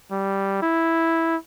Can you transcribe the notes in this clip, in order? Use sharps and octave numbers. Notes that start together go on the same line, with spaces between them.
G3
E4